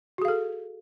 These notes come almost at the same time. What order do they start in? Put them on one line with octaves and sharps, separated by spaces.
F#4 G#4 F5 A4